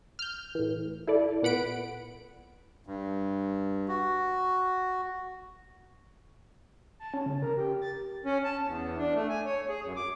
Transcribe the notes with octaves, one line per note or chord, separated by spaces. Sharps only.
F6 G6
A2 E3
E4 A4 D5
A#2 B3 F#5 B5 D7
G2
F#4
A5
C#4
C#3
A#4
G4
A6
C#4
A5
E2
D4
A3
G#5
C#5
G#4
F#2
D6